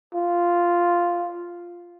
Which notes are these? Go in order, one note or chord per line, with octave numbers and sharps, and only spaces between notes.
F4